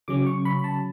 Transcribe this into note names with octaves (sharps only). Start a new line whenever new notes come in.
C#3 F#3 C#4 D6
C#6
B5
B5
A5